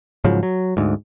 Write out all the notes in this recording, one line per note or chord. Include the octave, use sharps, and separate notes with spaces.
G#2 C#3 F3 F#3
F#3
D2 G#2